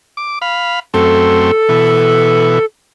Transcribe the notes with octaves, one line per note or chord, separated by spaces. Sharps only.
D6
F5 B5
F#2 A3 C4 A4
B2 E3